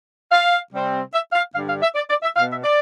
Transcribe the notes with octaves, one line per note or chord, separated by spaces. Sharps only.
F5
C3 G3 C4
E5
F5
G2 D3 G3 F5
F5
E5
D5
D5
E5
B2 B3 F5
E5
D5